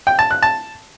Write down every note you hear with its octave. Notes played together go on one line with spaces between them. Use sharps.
G5
A5
F#6
A5